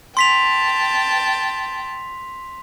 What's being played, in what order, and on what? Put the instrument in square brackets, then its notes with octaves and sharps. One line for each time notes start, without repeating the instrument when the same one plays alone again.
[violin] G5 A5 [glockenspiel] C6 B6 F7